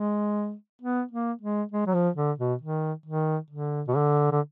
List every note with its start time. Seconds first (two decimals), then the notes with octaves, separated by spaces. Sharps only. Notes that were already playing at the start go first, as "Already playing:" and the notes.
Already playing: G#3
0.82 B3
1.11 A#3
1.42 G#3
1.72 G#3
1.87 F#3
1.94 F3
2.16 D3
2.38 B2
2.61 D#3
3.06 D#3
3.51 D3
3.88 B2
3.96 D3
4.32 D3